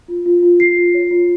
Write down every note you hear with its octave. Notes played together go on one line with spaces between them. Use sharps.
F4
F4
F4
F4 C7
F4
C#5
F4